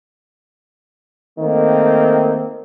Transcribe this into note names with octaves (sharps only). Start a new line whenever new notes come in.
D#3 A3 A#3 C4